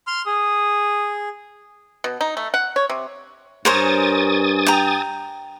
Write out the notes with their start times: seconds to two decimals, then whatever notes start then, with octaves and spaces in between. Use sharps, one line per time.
0.07 C6 F6
0.26 G#4 D#6
2.04 B2
2.21 D#4
2.37 A3
2.54 F#5
2.76 C#5
2.90 C3
3.65 G2 A#4 C5 C#5 G#5 D#6 A6
4.66 G5 A#5